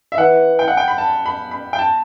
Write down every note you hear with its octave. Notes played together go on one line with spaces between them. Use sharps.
E5
E3 F#5
G5
F#5
G5
B5
A5
B5
B5
G5
A5